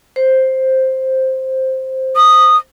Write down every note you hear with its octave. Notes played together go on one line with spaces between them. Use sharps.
C5
D#6